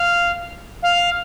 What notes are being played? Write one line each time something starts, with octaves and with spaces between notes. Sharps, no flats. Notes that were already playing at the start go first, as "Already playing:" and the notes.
Already playing: F5
F5